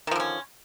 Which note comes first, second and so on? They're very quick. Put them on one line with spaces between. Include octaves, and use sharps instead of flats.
D#3 F3 D3 C#4